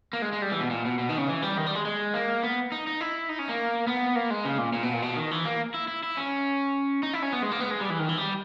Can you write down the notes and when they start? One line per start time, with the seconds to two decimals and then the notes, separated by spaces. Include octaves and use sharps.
0.13 A#3
0.22 G#3
0.32 G#3
0.42 G3
0.51 E3
0.61 B2
0.71 A#2
0.85 B2
0.99 B2
1.09 D#3
1.18 C#3
1.28 E3
1.42 G3
1.57 D#3
1.66 G3
1.75 G#3
1.85 G#3
2.14 A#3
2.43 B3
2.72 D#4
2.87 D#4
3.01 E4
3.29 D#4
3.39 C#4
3.49 A#3
3.87 B3
4.15 A#3
4.30 G#3
4.45 C#3
4.58 A#2
4.73 A#2
4.83 B2
4.93 A#2
5.02 B2
5.16 D#3
5.31 E3
5.45 A#3
5.74 E4
5.88 E4
6.03 E4
6.17 C#4
7.03 D#4
7.13 E4
7.22 C#4
7.32 B3
7.42 G#3
7.51 A#3
7.60 B3
7.71 G#3
7.81 G3
7.90 E3
7.99 D#3
8.09 E3
8.18 G3